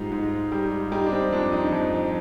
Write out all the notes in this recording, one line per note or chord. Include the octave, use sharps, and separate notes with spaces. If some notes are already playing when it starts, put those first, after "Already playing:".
Already playing: G#2 G3 D#4 F4
G#2
G3
G3 D#4
D4
C4
F2 D4
D#4
F2